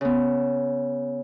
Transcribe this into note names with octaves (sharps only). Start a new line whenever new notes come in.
C#3 B3